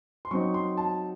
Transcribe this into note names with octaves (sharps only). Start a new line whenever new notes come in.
C6
F#3 C4 D#4 C#6
C6
A5